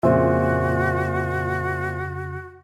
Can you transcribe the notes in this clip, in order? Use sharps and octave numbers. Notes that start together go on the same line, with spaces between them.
F2 A#2 C#3 F#4 C5 E5